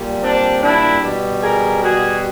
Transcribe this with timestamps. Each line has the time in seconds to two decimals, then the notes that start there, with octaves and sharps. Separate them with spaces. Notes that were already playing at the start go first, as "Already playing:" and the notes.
Already playing: A#2 G3
0.22 C4 D4
0.61 D4 E4
1.02 B2 G3
1.42 G#4 A#4
1.81 F#4 G#4